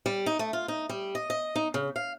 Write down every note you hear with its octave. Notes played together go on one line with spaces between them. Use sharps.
G3
D#4
A3
F4
D#4
G3
D#5
D#5
D#4
C#3
F5